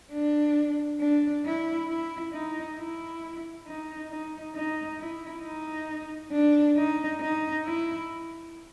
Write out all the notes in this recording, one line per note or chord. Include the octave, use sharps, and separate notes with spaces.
D4
D4
E4
E4
D#4
E4
D#4
D#4
D#4
E4
D#4
D4
D#4
D#4
E4